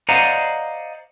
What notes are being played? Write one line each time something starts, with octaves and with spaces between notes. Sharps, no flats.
C5 D5 D#5 F5 F#5 A#5